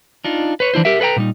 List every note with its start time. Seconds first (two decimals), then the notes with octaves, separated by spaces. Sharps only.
0.25 D4 D#4 F4
0.60 B4 C#5
0.74 E3 D4 E4 C5
0.85 G4 A#4 E5
1.00 A4 B4 D#5 G5 A#5
1.16 A#2 G3 D#4